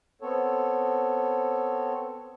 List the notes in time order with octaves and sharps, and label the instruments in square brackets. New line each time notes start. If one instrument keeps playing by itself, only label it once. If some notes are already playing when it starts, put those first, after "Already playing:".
[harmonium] B3 C4 A4 C#5